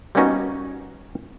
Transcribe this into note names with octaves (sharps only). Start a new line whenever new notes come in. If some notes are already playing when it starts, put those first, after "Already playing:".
G3 A#3 B3 C#4 D#4 F#4